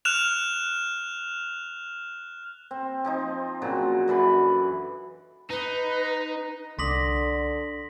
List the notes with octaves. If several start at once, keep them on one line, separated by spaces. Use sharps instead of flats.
F6 F#6 E7 F7
C4
F3 C4 D#4
A#2 C#3 F#3
F#2 D3 E3 B5
D#4 B4
C2 D3 C6 D6 D#6 A#6 B6 F#7